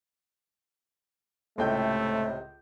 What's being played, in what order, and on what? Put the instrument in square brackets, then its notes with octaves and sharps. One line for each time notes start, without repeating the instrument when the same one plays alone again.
[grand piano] C#2 G5 G6 [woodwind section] A2 C3 [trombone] A3